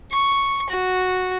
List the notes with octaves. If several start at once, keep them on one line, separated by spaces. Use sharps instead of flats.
C#6
F#4